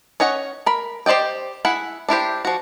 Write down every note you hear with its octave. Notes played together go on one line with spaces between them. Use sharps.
C#4 C#5 D#5 F#5
A#4 B5
G4 C5 D5 D#5 G5
E4 G#4 F#5
D4 E4 G4 C5
F3 F#4